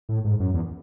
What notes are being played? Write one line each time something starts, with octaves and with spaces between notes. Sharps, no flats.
A2
G#2
F#2
E2